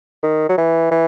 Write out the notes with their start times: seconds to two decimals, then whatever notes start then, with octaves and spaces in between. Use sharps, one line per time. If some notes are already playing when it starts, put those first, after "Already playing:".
0.23 D#3
0.49 F#3
0.58 E3
0.92 E3